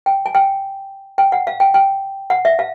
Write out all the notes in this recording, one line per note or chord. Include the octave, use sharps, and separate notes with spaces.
G5
G#5
G5
G5
F#5
F5
G5
G5
F#5
E5
F5